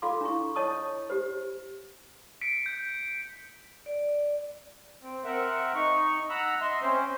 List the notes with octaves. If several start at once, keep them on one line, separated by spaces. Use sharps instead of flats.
F4 A4 F5 C6 D6
D4 E4 C#6
C#5 D#5 A5 C#6 D#6
G4 C5
B6 C#7 D7
G6
D5
C4
C4 A#4 E5 F#5
D#4 C#6
F#5 A#5 B5 E6
D#5 E5 C6
C4 C#4 C5